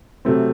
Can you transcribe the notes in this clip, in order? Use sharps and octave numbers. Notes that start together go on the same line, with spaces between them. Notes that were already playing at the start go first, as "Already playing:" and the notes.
C3 F#3 A3 C4